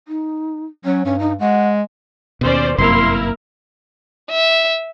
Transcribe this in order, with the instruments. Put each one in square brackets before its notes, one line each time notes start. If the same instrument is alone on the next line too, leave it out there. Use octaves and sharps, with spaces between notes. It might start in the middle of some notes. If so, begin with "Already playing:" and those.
[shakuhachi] D#4
[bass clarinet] F#3 [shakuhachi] C#4
[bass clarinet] G2 [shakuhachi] C#4
[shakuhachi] D#4
[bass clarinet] G#3 [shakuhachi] F#5
[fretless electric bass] D#2 B2 [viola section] C#4 C5 D5
[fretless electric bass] G1 F#2 C3 [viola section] A#3 E4 A#4 [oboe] C6
[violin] E5